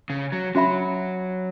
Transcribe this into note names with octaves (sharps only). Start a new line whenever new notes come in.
C#3
F#3
F#3 C#4 F#4 E5 B5